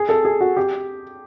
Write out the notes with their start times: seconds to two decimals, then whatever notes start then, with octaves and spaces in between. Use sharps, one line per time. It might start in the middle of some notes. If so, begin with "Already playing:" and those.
Already playing: G#4
0.09 A4
0.25 G#4
0.41 F#4
0.57 G4